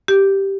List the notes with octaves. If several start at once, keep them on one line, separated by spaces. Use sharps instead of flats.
G4